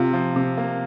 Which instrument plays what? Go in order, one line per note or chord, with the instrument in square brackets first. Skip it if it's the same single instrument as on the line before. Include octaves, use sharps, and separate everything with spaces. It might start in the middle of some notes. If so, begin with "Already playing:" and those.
Already playing: [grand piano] C3 [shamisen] F4
[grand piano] F3
C3
A#3